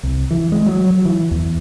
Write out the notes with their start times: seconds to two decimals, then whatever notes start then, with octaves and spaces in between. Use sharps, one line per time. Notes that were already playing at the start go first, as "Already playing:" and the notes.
0.03 C2
0.31 E3
0.52 G#3
0.66 F#3
0.90 F#3
1.05 E3
1.31 E2